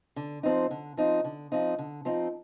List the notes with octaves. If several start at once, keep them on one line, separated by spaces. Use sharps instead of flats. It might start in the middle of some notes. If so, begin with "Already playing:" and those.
D3
F3 C4 D#4
D3
F3 C4 D#4
D3
F3 C4 D#4
D3
F3 C4 D#4